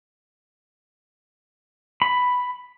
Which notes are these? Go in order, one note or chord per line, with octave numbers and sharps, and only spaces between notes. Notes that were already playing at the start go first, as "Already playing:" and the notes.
B5